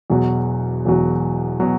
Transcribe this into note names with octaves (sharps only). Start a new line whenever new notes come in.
E1 E2 B2 F#3
E1 E2 B2 F#3
B2 F#3